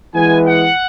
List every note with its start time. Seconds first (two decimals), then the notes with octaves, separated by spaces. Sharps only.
0.14 E3 G#3 B3 G#5
0.47 F#5